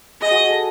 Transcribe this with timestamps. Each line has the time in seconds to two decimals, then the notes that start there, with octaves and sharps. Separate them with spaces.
0.21 G#4 D#5
0.31 F#4
0.41 G#4
0.50 A4